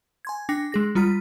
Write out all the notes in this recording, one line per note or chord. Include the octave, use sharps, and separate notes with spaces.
G#5 C6 G#6
D4 G5 D6 A#6 C#7
G#3 G#4 A#6
G3 F4 A#5 F6 B6